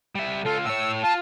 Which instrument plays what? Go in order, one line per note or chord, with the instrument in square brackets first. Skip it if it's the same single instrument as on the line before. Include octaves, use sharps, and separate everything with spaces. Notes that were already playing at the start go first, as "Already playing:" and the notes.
[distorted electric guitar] G3 E5
[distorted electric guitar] C#2 F4 [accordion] A4
[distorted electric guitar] A2 C#5 [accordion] E6
[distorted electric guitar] F4 [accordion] A5